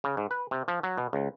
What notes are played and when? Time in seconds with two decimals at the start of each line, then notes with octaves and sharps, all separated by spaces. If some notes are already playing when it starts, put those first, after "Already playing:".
0.04 C#3
0.17 G#2
0.31 B4
0.51 C3
0.68 F3
0.83 F#3
0.98 B2
1.13 C#2